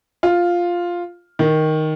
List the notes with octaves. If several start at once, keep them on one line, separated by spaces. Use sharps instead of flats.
F4
D#3